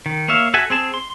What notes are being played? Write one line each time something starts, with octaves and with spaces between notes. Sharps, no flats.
D#3
A#3 C#5 E5 F5
F#4 A4 E5 F#5 G#5
C4 G#4 A5
C6